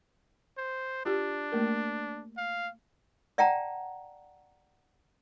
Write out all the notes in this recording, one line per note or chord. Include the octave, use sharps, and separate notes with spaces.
C5
D4 F4 G4
A3 A#3 A#4
F5
D5 E5 F#5 G5 A5 A#5